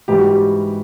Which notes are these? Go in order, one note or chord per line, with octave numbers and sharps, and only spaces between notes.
G#2 E3 G3 G4
F#4
G4